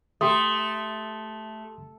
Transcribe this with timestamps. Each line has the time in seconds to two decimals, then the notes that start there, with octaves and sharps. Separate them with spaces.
0.21 A3 G4 C6 D#6